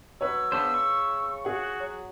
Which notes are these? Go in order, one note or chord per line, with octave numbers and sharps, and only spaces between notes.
F#3 B4 C#5 E6
C#3 B3 D4 C5
C#6
F#4 G#4 F#5
F#3